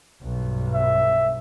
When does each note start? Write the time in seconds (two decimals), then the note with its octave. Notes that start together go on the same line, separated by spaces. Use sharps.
0.22 B1 G2
0.74 E5